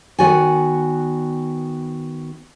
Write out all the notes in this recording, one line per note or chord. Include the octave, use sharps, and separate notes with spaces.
D#3 B3 F#4 D5 G#5